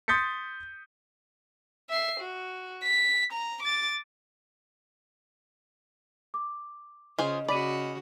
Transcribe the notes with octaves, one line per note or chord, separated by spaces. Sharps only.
C6 D#6 G6 A6 B6 C#7
E5 C7
F#4
B6
A#5
D6 A6
D6
C#3 F4 G#4 C5 D#5
C#3 F#4 D5 B5 B6 D#7